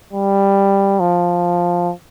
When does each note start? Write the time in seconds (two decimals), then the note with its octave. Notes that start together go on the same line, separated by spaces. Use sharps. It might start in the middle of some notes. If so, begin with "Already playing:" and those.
0.13 G3
1.00 F3